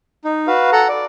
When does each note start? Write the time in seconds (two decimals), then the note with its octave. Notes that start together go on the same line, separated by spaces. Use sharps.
0.25 D#4
0.47 F#4 B4 F5
0.72 A4 F#5 A#5
0.88 D5